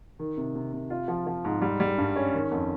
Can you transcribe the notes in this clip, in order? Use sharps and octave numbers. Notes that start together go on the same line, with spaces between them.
D#3
C3
C3
C3
F4
F3
F3
G#2
G3
G3
G2
C#4
D#3
F2